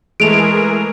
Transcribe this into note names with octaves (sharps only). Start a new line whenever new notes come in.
E3 G#3 A3 G#4 A#4 D7 F7